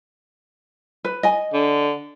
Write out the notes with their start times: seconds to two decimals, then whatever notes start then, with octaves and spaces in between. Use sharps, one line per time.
1.05 B4
1.23 D#5 G#5
1.53 D3